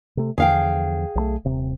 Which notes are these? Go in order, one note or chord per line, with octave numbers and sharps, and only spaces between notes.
C3 A3
E2 D3 F3 G#4 F5 G5
B1 F3 A3
D#1 C3